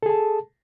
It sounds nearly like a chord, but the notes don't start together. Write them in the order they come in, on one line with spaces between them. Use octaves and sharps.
A4 G#4 A5